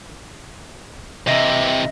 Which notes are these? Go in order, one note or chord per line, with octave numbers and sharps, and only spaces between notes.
C3 E3 D#5 E5 A#6